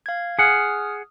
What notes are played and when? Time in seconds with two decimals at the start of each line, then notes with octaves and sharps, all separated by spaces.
0.06 F5 G#6
0.38 G#4 F#5 D#6 F6